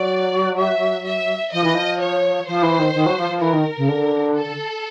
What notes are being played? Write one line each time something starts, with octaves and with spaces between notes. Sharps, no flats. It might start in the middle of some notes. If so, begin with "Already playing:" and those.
Already playing: F#3 D5
E5
E5
F3 D#5
E3
F3
C#5
F3 C5
E3
D#3
D#3
F#3
F3
F3
E3 A#4
D#3
C#3
D3
A4